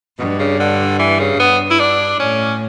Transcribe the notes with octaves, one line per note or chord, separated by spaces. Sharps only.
G2 B2
C#3
D3
E3
C#3
G2 B3
E4
D4
A2 C#4